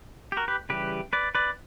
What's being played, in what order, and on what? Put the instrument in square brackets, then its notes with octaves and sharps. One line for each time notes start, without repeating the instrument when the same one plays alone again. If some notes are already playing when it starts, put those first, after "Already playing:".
[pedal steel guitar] G4
F#4 A#4
G4 B4
C#3 E3 G3 G4 B4
B4 D5
B4 D5